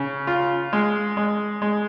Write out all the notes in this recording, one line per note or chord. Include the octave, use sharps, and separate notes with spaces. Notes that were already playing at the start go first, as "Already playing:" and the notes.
Already playing: C#3
F4
G#3
G#3
G#3